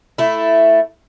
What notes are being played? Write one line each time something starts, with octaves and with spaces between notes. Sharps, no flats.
A3 E4